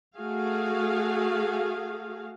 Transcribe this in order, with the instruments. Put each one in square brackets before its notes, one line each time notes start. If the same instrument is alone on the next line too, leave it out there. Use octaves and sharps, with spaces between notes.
[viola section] A3 F#4 G#4 F5